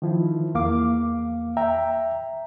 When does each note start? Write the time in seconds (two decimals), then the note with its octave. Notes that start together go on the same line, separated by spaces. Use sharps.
0.02 D#3 F3 E4
0.54 E2 A#3 F5 D6
1.57 E5 G5 A#5